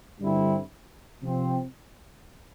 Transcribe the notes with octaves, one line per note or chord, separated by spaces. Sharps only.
G2 D3 G3 C4 E4
C3 F3 C4